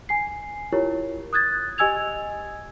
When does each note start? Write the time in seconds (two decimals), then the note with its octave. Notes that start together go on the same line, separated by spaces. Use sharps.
0.09 G#5 C7
0.72 E4 F4 G4 A#4 C#5
1.33 D#6 F#6 G#6 A6
1.78 G4 D#5 G#5 E6 G#6 F7